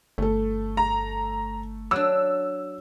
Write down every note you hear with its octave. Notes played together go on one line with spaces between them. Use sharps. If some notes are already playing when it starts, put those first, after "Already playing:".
G1 A3 A4
A#5
F#3 D4 E6